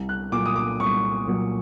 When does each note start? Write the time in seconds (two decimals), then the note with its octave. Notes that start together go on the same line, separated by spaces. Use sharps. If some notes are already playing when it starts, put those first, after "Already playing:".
Already playing: C2
0.09 F#6
0.32 A#2 F#3 D6
0.46 D#6
0.56 D6
0.80 C2 C#6
1.27 A#2 F#3